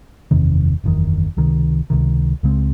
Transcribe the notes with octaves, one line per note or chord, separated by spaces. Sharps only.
F#1 E2 C3 D#3
F#1 E2 C3 D#3
C#2 C3 D#3
C#2 C3 D#3
C#2 C#3 G#3 C4